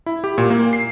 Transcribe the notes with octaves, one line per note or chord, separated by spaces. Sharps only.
E4
G4
A#2
A#3
C7